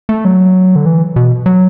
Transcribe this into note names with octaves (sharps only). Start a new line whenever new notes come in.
A3
F#3
D3
E3
B2
F#3